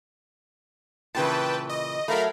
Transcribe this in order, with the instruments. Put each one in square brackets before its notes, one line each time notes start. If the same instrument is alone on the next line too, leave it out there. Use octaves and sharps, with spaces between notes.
[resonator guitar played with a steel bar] A#2 C#3 E3 [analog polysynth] B4 G5 A5
[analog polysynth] D#5
[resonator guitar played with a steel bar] F#3 A3 [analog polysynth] A#4 F5 B5